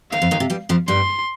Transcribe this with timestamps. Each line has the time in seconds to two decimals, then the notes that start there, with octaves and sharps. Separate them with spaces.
0.12 D#2 D#3 F5
0.22 F2 F3
0.31 D#2 D#3
0.40 C3
0.50 G2 G3
0.69 F2 F3
0.88 G2 G3 C6